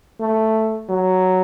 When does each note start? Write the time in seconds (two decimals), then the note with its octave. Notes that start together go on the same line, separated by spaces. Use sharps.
0.21 A3
0.89 F#3